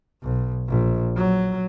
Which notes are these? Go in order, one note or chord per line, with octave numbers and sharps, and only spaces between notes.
B1
A#1
F#3